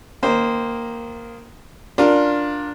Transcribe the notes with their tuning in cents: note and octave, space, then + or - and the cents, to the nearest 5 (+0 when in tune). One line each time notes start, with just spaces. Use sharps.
D#3 +0 A#3 +0 C5 -10
D4 +0 F4 +15 A#4 +0